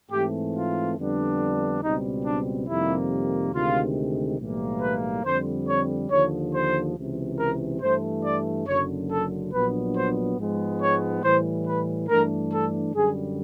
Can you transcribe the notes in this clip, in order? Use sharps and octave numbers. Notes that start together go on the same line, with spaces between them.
G#2 E3 A3 C4 G4
F4
F2 D3 G3 B3 D4
C#2 B2 G3 C4 D#4
D4
F2 C3 D#3 G3 A#3 E4
D2 C3 D#3 G#3 F4
B1 A2 E3 G3 A#3
B4
F2 D3 G3 C4 C5
C#5
D#2 D3 F3 C#5
C5
C#2 C3 E3
A#4
G2 E3 A3 C5
D5
F#1 F#2 D3 C#5
A4
A#1 A#2 F#3 B3 D4 B4
C5
G#2 F3 G#3 B3
C#5
A2 E3 G3 C5
B4
G2 E3 A3 D4 A#4
A4
F#2 D3 G3 G#4